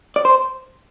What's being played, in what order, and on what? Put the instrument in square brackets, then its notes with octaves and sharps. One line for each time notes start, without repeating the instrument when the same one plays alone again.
[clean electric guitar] D5
C5